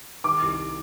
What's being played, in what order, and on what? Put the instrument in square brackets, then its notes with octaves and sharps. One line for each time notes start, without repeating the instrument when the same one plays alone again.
[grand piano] D#3 [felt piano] D6
[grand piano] C2